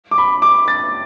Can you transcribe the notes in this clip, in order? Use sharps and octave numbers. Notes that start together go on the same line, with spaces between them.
D6
B5
D6
A6